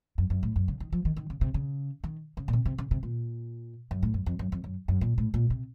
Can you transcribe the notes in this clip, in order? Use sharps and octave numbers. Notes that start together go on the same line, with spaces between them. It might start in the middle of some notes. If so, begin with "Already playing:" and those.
F#2
F#2
A2
F#2
C#3
D#3
F3
D#3
D#3
C#3
C3
C#3
D#3
C#3
A#2
C3
C3
C#3
C3
A#2
F#2
A2
F#2
F2
F#2
F2
F#2
F#2
A#2
A2
A#2
C3